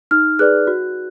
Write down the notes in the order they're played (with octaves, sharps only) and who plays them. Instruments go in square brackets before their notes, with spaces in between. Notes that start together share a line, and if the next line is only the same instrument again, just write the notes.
[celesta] D#4 F6
G#4 B4 D5 F#6
F#4